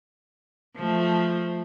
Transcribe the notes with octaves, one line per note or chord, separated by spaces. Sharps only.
F3 A3